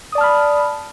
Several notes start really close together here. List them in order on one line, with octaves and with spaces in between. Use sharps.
D#6 D5 A5 F6 B5